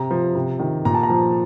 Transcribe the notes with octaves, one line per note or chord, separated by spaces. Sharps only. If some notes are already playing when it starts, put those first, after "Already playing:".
Already playing: C3 A#5
F3
C3
D#3
A#2 A#5
A5
A#5
F3